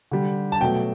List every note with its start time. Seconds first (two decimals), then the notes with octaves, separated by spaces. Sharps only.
0.11 D3 G3
0.52 A5
0.60 B2 F#3 A3 G5